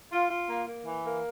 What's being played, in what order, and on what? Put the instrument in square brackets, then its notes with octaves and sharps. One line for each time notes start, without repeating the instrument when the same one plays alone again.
[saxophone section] F4
F4
A#3
A#3
E3
A#3